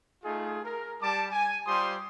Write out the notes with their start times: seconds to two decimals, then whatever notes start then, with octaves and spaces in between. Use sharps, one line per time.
0.24 A3 D#4 F4 G#4
0.63 A#4
1.02 G3 A5 D6
1.32 G#5
1.66 G3 F4 G4 C5 C6 D#6